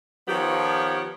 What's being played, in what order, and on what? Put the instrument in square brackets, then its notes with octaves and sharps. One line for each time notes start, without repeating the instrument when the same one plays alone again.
[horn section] D#3 F3 B3 G4 C#5